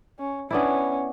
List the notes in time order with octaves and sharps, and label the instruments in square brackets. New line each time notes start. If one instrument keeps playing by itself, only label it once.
[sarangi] C#4
[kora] B3 D4 E4 [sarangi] C#4